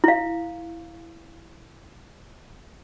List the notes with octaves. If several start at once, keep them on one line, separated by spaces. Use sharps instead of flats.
E4 F5